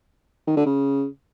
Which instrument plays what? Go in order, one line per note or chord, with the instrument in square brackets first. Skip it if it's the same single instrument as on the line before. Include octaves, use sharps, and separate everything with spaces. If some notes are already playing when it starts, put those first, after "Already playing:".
[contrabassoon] D#3
D3
C#3